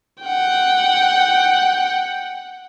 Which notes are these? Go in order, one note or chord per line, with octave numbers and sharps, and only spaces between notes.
F#5 G5